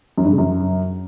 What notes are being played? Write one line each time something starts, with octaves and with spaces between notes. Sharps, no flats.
F#2
G2
C#3
F#2